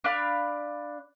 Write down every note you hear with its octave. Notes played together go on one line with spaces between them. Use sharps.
D4 D5 F5 B5